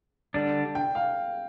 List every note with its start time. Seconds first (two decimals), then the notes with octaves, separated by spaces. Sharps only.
0.34 D3 G3 D4
0.75 G5
0.95 F5